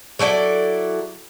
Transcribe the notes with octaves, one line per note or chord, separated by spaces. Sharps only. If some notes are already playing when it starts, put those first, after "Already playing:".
F#3 E4 A4 D5